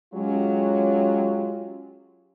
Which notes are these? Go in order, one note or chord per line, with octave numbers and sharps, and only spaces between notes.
F#3 G#3 C#4 F4 G4